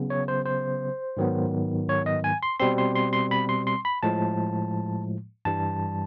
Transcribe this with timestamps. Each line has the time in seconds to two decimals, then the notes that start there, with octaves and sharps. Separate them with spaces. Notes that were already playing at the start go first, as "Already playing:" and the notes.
Already playing: C#3 F#3 B3
0.10 C#5
0.28 C5
0.46 C5
1.17 G#2 D#3 F#3 B3
1.89 C#5
2.06 D#5
2.24 G#5
2.43 C6
2.60 B2 G3 C4 C6
2.78 C6
2.95 C6
3.13 C6
3.31 B5
3.49 C6
3.67 C6
3.85 B5
4.03 A2 F3 G#3 A5
5.45 G2 E3 G3 A5